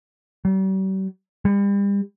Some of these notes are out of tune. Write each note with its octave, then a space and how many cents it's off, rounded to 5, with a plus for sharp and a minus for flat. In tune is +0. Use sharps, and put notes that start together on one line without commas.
G3 -45
G3 +35